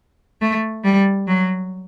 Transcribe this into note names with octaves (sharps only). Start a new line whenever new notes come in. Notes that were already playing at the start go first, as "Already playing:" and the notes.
A3
G3
F#3